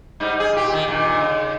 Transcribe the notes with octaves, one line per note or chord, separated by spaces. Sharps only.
G#2 G3 D#4
G#4
A#2 G4
D#3
G2 A#2 D#3
C#3